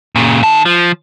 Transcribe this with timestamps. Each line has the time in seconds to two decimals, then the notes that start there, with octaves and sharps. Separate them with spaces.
0.15 A#2 C#3
0.43 D#3 A5
0.65 F3